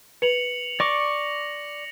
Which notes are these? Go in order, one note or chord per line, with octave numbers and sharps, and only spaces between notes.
B4 C#7 F7 F#7
D5 C#6 D6 A#6